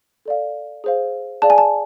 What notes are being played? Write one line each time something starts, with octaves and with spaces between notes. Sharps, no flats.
A4 D5 F5
G#4 C5 F5
G#4 D5 F5 A5
G#5
A5